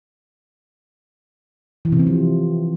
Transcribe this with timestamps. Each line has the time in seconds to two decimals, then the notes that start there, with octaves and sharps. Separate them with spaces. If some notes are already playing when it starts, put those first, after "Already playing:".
1.85 E3
1.92 C3
2.00 C4
2.07 F3